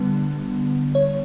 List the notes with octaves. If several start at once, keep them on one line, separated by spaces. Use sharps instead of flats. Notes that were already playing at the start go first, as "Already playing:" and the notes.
Already playing: D3 G3 B3
C#5